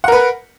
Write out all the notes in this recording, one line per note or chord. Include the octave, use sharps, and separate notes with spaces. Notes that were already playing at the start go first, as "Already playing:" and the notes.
A#4 B4 F#5